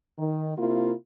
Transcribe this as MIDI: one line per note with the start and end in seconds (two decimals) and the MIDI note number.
0.17 0.52 51
0.56 0.91 48
0.56 0.91 58
0.56 0.91 64
0.56 0.91 65